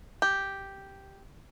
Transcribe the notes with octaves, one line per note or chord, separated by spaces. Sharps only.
G4